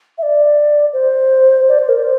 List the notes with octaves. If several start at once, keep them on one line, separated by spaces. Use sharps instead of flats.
E5
D5
C5
D5
C5
A#4
D5
C5